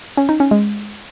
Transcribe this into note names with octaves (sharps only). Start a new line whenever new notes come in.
C#4
D#4
C#4
G#3